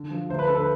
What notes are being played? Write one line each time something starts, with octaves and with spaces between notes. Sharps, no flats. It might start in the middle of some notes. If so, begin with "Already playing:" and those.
Already playing: D3
F3
D2 C5
B4
D3 A4
B4